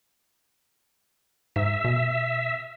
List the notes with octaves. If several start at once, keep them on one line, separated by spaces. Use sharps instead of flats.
G#2 E5
B2